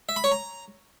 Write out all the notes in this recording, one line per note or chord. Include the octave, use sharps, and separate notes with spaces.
E5
B5
C#5
A#5